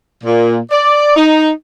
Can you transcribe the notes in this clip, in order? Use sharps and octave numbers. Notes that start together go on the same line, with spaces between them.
A#2
D5
D#4